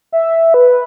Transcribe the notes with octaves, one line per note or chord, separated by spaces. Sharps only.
E5
B4